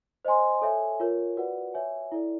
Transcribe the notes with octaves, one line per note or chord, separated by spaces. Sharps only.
C5 D#5 G#5 C6
A4 C#5 E5 G#5
F4 A#4 C#5
F#4 B4 D5 F#5
C#5 E5 G#5
E4 A4 D5